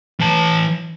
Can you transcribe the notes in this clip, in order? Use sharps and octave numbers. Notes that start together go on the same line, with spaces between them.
E3 A5